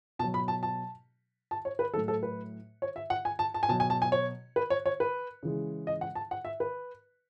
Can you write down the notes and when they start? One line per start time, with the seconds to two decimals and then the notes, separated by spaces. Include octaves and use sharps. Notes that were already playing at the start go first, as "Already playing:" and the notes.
0.19 B2 A5
0.24 F#3
0.34 B5
0.48 A5
0.63 A5
1.51 A5
1.65 C#5
1.79 B4
1.94 A2 F#3 A4
2.08 A4
2.23 B4
2.82 C#5
2.96 E5
3.10 F#5
3.25 G#5
3.39 A5
3.54 A5
3.63 G#5
3.69 B2 F#3 A5
3.80 G#5
3.90 A5
4.02 G#5
4.12 C#5
4.56 B4
4.70 C#5
4.86 C#5
5.00 B4
5.43 C#3 E3 G#3
5.87 D#5
6.01 F#5
6.15 A5
6.31 F#5
6.45 E5
6.60 B4